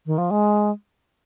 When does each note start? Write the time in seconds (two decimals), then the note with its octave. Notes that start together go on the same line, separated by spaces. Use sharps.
0.06 D#3
0.18 F3
0.31 G#3